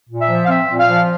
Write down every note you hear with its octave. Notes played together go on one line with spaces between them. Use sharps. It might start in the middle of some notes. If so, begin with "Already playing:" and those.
A#2
E5
F3
F5
C4 E5
A#2
F5
F3